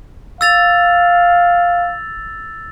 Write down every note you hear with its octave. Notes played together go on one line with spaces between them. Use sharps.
F5 E6 A6 F7